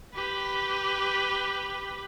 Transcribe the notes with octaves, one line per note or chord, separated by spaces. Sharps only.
G4 B4